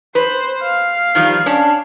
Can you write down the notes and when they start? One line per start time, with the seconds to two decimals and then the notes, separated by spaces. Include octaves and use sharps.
0.15 B4 C5
0.63 F5
1.15 D#3 F3 G3
1.46 C#4 D4